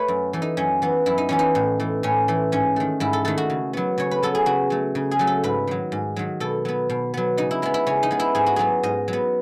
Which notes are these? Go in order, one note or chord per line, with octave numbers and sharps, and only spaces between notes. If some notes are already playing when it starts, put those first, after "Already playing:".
Already playing: A3 B4 C#5
F#2
E3 A3
D#4
F#2 C#4
E3 B3
F#2 E4
D#4
E3 B3 C#4
D#4
A2
E3 A3
A2 C#4
E3 A3
G#2 C#4
D#3 A3
G#2 E4
A4
D#3 A3 A4
F#4
C#3
F#3 B3
C#3 C#5
B4
F#3 B3 A4
G#4
C#3 F#4
F#3 A3
C#3
G#4
F#3 A3
A4
G#2 B4
D#3 F#3
G#2
D#3 F#3
B2 A4
F#3 B3
B2
F#3 B3
C#3 D#4
E4
G#3 B3 E4
E4
C#3 C#4
D#4
G#3 B3
E4
G#2 G#4
F#4
F#3 B3 G#4
G#2 D#5
F#3
B3